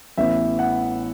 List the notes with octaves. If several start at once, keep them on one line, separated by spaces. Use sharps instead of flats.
A1 A2 E3 B3 E5
F#5